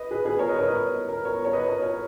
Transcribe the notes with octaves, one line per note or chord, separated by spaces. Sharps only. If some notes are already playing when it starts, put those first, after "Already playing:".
Already playing: B4 D#5
G#4 B4
G#4 B4
A#4 C#5
B4 D#5
A#4 C#5
B4 D#5
A#4
B4
A#4 C#5
C#5
B4 D#5
A#4 C#5
A#4 C#5